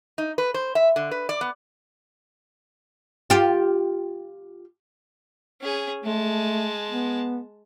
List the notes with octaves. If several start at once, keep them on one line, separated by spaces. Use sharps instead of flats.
D#4
B4
C5
E5
D3
B4
D5
B3
F4 G4
C#4 G#4
G#3 A3 A5
B3